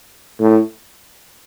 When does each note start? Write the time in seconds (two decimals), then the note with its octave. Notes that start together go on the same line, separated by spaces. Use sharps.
0.40 A2